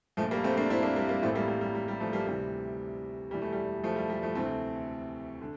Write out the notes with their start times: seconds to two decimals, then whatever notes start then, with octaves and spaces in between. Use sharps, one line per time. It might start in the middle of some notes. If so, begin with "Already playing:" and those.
0.17 A#2 F3 A3
0.21 A#1
0.31 G3 A#3
0.44 A3 C4
0.57 A#3 D4
0.70 C4 E4
0.83 A#3 D4
0.96 G3 A#3
1.09 G3 A#3
1.22 A1 A2 E3 A3 C4
1.35 G3 A#3
1.48 G3
1.61 G3
1.75 G3
1.88 G3
2.00 F3 A3
2.13 G3 A#3
2.27 D2 C3 E3 G3
3.31 E1 E2 E3 G3
3.42 A3
3.53 G3
3.84 F3 A3
3.96 G3
4.10 G3
4.23 F3 A3
4.35 D2 C3 E3 A3 C4
5.41 D3